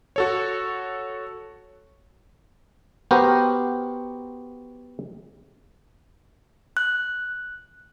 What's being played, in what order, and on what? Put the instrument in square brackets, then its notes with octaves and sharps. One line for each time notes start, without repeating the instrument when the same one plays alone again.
[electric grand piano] F#4 A4 C#5
[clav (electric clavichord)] B3 F#4 G4 A#4 C5
[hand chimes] F#6